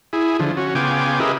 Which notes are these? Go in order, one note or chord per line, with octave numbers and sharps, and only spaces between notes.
E4 G#4
D3 F3
C#4 F#4
C#3 B3 F4 G5 G#5 D6
G4 G#4 A#4 B4 D#5 E5